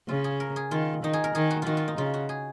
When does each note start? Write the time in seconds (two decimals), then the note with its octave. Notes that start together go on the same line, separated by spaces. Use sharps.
0.09 C#3 F4
0.24 G#4
0.40 A#4
0.56 G#4
0.71 D#3 F4
1.03 D#3 D#4
1.13 G#4
1.24 A#4
1.35 D#3 G#4
1.51 F#4
1.62 D#3 F4 F#4
1.77 F4
1.88 D#4
1.98 C#3 F4
2.14 F#4
2.29 G#4